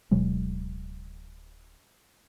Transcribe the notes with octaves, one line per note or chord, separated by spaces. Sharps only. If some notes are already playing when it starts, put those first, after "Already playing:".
D1 B2 F#3 G#3